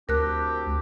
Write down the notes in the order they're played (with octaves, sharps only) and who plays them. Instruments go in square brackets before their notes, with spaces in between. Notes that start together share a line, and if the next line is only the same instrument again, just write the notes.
[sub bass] D2 [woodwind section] C4 D4 G4 [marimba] A#4 F#6